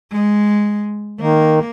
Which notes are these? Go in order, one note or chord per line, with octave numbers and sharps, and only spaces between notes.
G#3
D#3 A#3